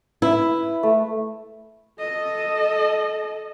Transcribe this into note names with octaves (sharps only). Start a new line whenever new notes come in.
E4 B4
A3
A4 D#5